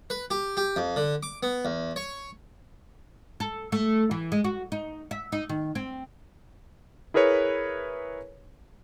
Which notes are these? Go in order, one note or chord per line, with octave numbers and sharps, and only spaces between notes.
B4
G4
G4
F2
D3
D6
B3
E2
C#5
A4
A3
E3
G#3
F#4
D#4
E5
D#4
D#3
C4
E4 G#4 A#4 B4 C#5